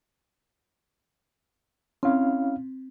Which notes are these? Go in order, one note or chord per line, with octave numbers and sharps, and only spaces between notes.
C4 C#4 E4 F5